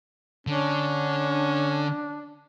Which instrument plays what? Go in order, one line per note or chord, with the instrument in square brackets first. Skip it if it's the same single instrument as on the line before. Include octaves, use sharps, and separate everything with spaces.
[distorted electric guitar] D3 [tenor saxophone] C#4 [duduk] D4